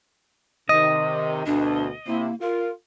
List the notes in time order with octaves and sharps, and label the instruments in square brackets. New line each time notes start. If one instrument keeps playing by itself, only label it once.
[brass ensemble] C3 D#3 [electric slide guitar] D#5
[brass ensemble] D2 B2 [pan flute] D4
[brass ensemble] C3 E4 [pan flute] A#3
[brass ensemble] F4 [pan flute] A#4